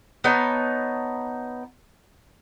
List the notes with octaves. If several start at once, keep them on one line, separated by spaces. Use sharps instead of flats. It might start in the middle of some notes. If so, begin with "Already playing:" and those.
B3 D#4 C#5 A5